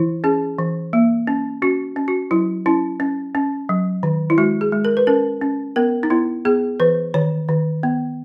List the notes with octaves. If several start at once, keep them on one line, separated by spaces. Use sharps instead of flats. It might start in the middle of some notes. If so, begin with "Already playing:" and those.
Already playing: E3 E4
C#4 G#4
E3
A#3
C#4
C#4 F#4
C#4
F#4
F#3 E4
C#4 E4
C#4
C#4
F#3
D#3
E4
G#3 F#4
G#4
G#3
A#4
B4
C#4 A#4
C#4
B3 A#4
D#4
B3 E4
B3 G#4
E3 B4
D#3 C#5
D#3
B3